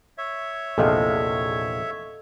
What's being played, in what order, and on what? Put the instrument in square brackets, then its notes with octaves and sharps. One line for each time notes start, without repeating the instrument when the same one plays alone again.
[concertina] C#5 E5
[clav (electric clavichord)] A#1 E2 C3 [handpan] A4 D#5 F5